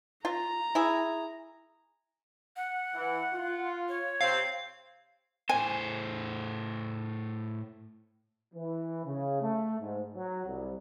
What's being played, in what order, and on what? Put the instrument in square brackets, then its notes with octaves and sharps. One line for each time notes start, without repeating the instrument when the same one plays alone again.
[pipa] F4 [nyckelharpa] A#5
[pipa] E4 G#4
[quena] F#5
[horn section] E3
F4
[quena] C#5
[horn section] C3 C4 [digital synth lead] F5
[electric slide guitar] A2 C5 [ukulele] G#5
[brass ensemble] E3
C#3
A3
G#2
F#3
C2